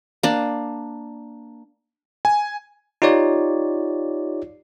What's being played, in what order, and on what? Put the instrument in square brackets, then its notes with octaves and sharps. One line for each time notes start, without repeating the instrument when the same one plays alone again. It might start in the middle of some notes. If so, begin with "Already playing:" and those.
[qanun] A#3 D4
[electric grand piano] G#5
[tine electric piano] D#4 F4 G4 C#5 D5